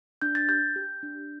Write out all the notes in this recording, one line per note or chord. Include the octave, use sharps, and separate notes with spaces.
D4 G6
A6
G4 G6
G4
D4